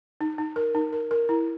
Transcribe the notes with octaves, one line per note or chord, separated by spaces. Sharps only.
D#4
D#4
A#4
D#4
A#4
A#4
E4